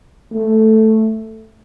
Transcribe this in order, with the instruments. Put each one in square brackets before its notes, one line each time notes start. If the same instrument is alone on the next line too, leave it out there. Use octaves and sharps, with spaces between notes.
[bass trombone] A3